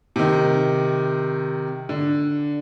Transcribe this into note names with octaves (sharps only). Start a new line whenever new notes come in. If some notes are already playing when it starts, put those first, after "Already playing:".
C3 D#3
D3